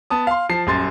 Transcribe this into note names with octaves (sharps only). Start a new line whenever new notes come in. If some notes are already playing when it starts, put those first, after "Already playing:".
B3 A5 D#6
F5 C6
F3 A5 C7
D#1 F#2 C6 A6